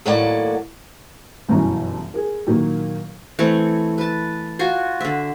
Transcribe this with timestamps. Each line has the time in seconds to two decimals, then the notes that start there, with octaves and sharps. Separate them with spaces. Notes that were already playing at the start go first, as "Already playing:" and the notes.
0.06 D#2 A2 F#3 A#3 D5 F#5
1.49 G1 F#2 B2 E3 C#4 A#5
2.14 G#4 A#4
2.47 A#2 D#3 F#3 A#3
3.39 E3 A3 C4 C#5
3.98 B4 A5
4.59 F4 F#4 G#5
5.01 D3 E5